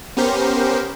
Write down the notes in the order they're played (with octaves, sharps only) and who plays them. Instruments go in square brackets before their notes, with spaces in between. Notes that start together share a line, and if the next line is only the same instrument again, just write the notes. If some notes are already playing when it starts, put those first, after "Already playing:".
[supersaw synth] B3 C#4 G4 A#4 C5